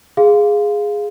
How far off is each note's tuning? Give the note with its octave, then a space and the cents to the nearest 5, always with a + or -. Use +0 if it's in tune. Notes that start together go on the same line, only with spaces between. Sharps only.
G#4 -5 F5 +0 C6 -20